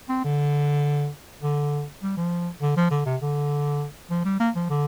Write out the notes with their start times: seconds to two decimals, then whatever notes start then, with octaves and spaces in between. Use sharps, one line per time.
0.09 C4
0.24 D3
1.43 D3
2.03 G3
2.17 F3
2.62 D3
2.77 F3
2.91 D3
3.06 C3
3.22 D3
4.11 F3
4.25 G3
4.40 A#3
4.56 F3
4.70 D3